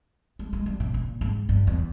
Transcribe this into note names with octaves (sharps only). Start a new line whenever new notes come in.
G#3
G#3
G3
A#2
A#2
G#2
G2
E2